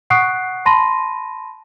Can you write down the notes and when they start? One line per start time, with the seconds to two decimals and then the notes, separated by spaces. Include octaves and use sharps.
0.10 F#5 C#6 D#6 F#6 C7 D7
0.66 A5 B5 C6 A#6 D#7